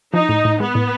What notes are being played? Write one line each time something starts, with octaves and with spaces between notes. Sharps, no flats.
F3 D#4
A2
A2
G#3 B3
A2